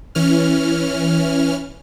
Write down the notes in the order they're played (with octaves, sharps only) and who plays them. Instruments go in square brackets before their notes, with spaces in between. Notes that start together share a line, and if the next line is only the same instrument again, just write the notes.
[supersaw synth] E3 C#4 F6